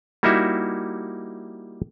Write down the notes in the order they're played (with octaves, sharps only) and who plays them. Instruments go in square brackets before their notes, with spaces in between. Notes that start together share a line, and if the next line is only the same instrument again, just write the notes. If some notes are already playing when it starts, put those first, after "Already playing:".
[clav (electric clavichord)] G3 A#3 D#4 E4 F#4 E5